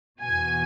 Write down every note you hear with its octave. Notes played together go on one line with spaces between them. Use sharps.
E2 B2 G#5